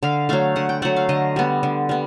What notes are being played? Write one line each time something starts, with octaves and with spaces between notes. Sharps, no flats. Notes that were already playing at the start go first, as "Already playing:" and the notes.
D3 F5
F#3 A3 F5
D3 F#5
G5
F#3 A3 F#5
F5
D3 D#5
G3 B3
D3
G3 B3